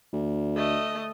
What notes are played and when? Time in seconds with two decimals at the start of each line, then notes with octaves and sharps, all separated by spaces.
0.13 D2
0.56 A3 D#5